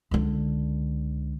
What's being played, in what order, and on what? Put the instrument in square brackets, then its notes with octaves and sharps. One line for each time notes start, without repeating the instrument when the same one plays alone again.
[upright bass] C#2 D3